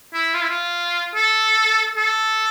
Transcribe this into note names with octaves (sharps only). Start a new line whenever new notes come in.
E4
F4
E4
F4
A4
A4